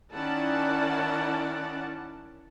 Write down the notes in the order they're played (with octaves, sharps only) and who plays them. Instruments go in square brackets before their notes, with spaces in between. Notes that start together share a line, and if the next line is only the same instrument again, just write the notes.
[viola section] D#3 C#4 E4 D5 F#5 A5